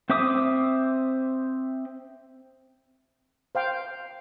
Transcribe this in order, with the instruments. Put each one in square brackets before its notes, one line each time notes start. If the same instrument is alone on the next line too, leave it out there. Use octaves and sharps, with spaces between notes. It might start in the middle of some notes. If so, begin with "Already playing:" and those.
[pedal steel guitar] C4 C5 E5 D6 D#6
[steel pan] C5 F5 G5